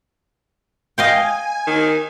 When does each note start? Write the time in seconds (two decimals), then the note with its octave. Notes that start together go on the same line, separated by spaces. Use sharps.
0.98 D#5 F5 G5 G#5
1.67 D#3